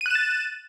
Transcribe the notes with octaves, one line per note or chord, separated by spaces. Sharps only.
F#6 A6 D#7 E7